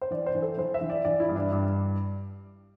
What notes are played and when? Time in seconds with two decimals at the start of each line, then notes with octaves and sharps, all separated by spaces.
0.02 C5
0.11 E3 D5
0.26 C5
0.35 E3
0.42 A4
0.58 E3 C5
0.74 E5
0.81 E3
0.90 D5
1.05 E3 D5
1.20 E4
1.29 G2
1.36 D4
1.52 G2 D4